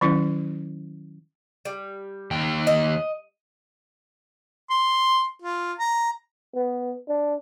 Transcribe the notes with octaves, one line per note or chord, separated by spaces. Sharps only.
D#3 F#3 C#4 E4
G3
D#2 G5
D#5
C6
F4
A#5
B3
D4